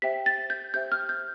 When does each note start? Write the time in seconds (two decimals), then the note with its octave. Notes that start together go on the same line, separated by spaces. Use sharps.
0.02 G4 C5 E5 G5 B6
0.26 A6
0.50 G6
0.74 G4 C5 E5 G5 G6
0.92 F6
1.09 G6